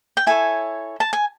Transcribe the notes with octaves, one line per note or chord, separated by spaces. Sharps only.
G5
E4 A4 C#5 G#5
A5
G#5